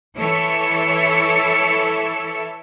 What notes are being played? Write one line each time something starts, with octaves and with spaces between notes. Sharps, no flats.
E3 E4 A4 C#5 E5